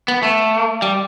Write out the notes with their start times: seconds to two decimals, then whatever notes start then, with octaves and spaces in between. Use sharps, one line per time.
0.08 B3
0.23 A3
0.82 G3